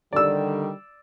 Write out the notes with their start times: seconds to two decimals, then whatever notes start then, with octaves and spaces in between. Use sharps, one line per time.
0.13 D3 D#3 G3 D5 E6